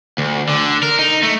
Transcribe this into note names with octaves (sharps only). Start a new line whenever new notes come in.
D2
D3
A#4
D#4
A3